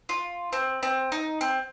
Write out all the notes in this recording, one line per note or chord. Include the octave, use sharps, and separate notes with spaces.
F4
C4
C4
D#4
C4